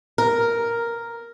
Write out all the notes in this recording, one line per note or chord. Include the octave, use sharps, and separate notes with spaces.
A#4